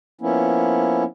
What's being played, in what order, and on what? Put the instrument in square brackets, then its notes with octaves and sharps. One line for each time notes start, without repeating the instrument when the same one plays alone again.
[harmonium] F3 A#3 B3 C#4 E4